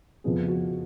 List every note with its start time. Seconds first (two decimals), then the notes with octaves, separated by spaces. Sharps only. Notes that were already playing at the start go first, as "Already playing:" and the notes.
0.24 F#1 F2 F3 B3 G#4
0.48 F#4